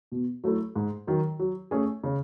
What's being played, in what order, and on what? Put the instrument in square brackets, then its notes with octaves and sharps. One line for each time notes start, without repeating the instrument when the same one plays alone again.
[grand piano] B2
F#3 A3 E4 A4
G#2
D#3 F#3
F#3
A3 C#4 G#4
C#3